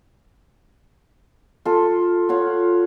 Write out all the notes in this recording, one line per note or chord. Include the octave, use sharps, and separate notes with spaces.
F4 A4
F4 C#5 F#5